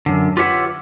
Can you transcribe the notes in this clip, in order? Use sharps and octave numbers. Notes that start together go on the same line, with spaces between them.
F#2 D3
F4 G4 B4 C#5 E5 F#5